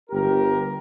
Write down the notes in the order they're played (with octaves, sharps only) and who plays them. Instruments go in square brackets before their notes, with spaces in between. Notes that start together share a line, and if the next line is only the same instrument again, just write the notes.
[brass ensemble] G1 G4 A#4